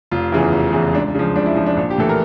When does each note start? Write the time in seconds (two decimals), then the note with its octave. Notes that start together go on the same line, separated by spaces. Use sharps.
0.11 F1 F4
0.32 E2 C#3 E3
0.52 F1
0.73 E2 C#3 E3
0.93 C#2 D4
1.15 C#3 F3
1.36 C#2 D4
1.46 E4
1.56 C#3 F3
1.66 D4
1.77 A#1
1.90 G4
1.98 A2 E3 A4
2.09 A#4